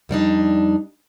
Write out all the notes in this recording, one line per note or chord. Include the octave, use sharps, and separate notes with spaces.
F2 G3 D4 D#4